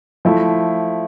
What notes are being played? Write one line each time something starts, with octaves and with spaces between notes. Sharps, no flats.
F3 A3 E4